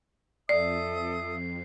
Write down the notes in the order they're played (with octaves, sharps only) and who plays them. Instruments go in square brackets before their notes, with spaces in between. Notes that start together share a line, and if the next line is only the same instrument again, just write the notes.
[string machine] F2 [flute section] A4 E5 D#6 [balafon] D5 [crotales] C7